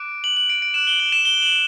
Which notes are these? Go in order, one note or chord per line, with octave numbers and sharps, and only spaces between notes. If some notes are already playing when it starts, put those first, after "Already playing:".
Already playing: D6 F#6 D7
F#7
F#7
D7
D7
D6 F#6 E7
G7
F#7
E7
G7
F#7